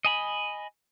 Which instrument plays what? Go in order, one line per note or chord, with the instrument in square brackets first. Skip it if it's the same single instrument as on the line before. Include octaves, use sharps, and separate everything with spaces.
[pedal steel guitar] D#5 G#5 B5